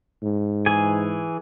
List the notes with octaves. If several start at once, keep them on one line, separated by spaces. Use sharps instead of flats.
G#2
E3 G#4 G#5